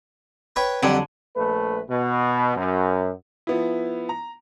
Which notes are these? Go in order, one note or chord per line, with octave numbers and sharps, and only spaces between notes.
B4 C#5 G5
F2 D3 F#3 G3
A#1 A3 B4
B2
F#2
F3 B3 E4
A#5